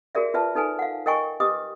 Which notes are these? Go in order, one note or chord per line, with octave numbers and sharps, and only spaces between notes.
F#4 G#4 A#4 D5 E5
F4 B4 D5 E5 A5
D#4 A4 B4 G#5
F5 F#5
A#4 D#5 G5 G#5 C#6
G4 B4 D#5 D6 D#6